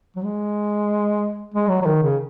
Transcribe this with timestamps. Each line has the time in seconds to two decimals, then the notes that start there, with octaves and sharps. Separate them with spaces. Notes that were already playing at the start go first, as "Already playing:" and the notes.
0.16 F#3
0.24 G#3
1.54 G#3
1.69 F#3
1.82 F#3
1.86 D#3
2.02 C#3